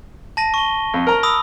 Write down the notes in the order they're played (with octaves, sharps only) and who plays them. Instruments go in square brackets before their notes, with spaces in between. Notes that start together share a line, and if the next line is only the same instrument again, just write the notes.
[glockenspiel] A5 A#6 D#7
C#6 G7
[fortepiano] F2
A#4 A#5
[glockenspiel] B5 D#6 E6